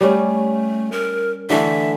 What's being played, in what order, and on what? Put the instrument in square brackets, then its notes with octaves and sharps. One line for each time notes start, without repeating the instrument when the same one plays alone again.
[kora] G3 C#4 [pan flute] A3
[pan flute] A#4
[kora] D3 E3 A3 [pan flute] E5